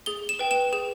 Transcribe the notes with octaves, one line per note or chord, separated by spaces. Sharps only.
G#4 G7
E7
B4 G5
E7
G#4 E7